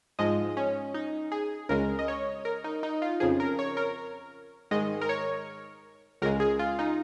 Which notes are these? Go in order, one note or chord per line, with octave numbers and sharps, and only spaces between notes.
G#2 F3 G#3 D#5
C#4
D#4
G#4
C#2 C#3 G#3 A#4
D#5
C#5
A#4
D#4
D#4
F4
F2 C#3 F3 G#4
A#4
C#5
A#4
G#2 D#3 G#3 D#5
A#4
C#5
C#2 C#3 G#3 A#4
G#4
F4
D#4